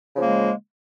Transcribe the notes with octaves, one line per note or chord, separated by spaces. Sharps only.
C#3 F3 G#3 A#3